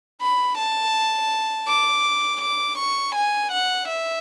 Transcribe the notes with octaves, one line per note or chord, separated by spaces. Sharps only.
B5
A5
D6
D6
C#6
G#5
F#5
E5